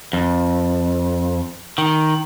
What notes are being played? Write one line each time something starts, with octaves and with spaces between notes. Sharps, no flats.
F2
D#3